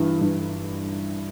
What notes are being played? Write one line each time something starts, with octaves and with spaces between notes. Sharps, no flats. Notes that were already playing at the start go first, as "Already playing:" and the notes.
Already playing: G2 E3
G2